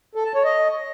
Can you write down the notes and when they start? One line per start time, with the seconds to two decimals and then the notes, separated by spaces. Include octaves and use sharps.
0.15 A4
0.25 A5
0.35 C#5
0.44 D#5